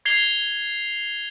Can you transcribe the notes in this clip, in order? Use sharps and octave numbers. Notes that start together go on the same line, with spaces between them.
G#6 C7 F7 G7